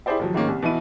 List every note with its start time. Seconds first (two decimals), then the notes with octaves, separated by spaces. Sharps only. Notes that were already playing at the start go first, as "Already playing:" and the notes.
0.06 E4 G4 G#4 C5 D5 E5
0.19 D#2 F3 F#3
0.34 G#2 D#3 A#3 C#4
0.48 C2
0.62 B2 E3 E4 D#7